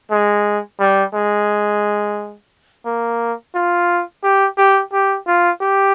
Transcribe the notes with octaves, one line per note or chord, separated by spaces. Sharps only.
G#3
G3
G#3
A#3
F4
G4
G4
G4
F4
G4